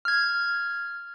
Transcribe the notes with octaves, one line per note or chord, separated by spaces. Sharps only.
F6 G#6